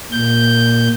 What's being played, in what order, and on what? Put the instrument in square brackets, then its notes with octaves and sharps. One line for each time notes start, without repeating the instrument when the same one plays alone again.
[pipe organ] A#2 G6